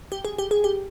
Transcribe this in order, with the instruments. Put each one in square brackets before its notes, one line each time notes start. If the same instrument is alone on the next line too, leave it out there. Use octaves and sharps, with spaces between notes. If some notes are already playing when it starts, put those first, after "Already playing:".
[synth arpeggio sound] G4
G#4
G4
G#4
G4